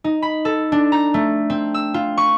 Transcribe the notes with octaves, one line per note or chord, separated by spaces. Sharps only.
D#4
B5
A4
D4
A#5
A3
C4
E6
F4
C#6